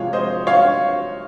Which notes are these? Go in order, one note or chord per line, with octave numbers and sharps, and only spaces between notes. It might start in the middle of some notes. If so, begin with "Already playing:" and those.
Already playing: C3 F3 G#3 C#5 F5
C5 D#5
C#5 F5